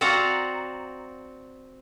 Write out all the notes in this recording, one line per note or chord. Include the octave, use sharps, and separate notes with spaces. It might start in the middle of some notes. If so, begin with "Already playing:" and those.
C4 F#4 D5 F5 F#5 A#5